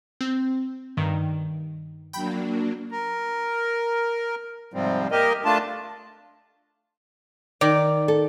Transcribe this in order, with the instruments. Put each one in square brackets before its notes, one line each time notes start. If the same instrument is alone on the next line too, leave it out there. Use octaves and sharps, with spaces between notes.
[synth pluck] C4
G2 D#3
[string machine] F#3 A#3 D4 [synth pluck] G5 B5 G6
[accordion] A#4
G#2 C3 F3 G3 C4
A#3 G4 A#4 D#5
A3 D4 F4 A5
[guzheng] D#3 [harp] D5
[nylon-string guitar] A4